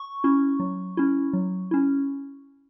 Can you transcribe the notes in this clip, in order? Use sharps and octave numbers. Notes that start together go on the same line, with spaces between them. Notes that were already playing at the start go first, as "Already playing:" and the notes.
Already playing: C#6
C#4 E4
F#3
C#4 E4
F#3
C#4 E4